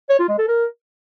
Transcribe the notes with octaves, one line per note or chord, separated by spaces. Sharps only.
C#5
F4
G#3
A4
A#4